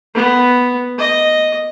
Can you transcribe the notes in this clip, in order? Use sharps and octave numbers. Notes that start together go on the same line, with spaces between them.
B3
D#5